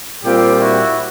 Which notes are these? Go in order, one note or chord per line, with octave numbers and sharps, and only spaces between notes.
A#2 G3 C4 F4 G4
E4 F#4